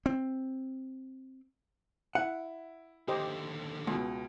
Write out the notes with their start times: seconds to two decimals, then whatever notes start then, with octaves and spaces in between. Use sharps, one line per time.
0.06 C4
2.15 E4 F#5
3.08 D#2 D3 G4 C5 D#5
3.87 C#2 B2